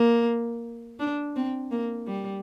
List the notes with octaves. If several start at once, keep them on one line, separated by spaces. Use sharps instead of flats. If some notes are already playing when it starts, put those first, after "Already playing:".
Already playing: A#3
D4
C4
A#3
G3